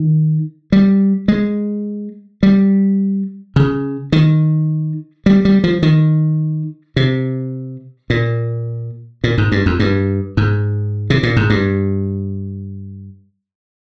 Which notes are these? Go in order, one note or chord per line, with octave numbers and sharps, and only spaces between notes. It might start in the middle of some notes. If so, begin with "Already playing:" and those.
Already playing: D#3
G3
G#3
G3
C#3
D#3
G3
G3
F3
D#3
C3
A#2
A#2
G#2
G2
F2
G2
G#2
C3
A#2
G#2
G2